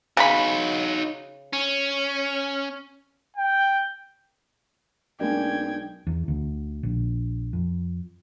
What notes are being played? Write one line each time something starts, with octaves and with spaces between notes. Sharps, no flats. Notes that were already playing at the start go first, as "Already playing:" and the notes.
C#3 D#4 F#4 B5
C#4
G5
B1 G#3 A#3 C#4 D4 G5 G#6
E2
D2
A#1
F2